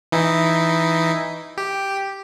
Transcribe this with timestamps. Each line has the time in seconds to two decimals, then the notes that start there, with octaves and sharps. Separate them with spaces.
0.12 E3 D#4 E4
1.57 G4